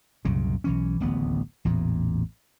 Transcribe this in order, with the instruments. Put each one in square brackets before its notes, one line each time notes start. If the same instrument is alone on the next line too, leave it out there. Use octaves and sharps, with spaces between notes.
[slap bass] C2 F#2 A#2 C#3
B1 E3 C#4
D1 A1 D#2 B3
A1 E2 A#2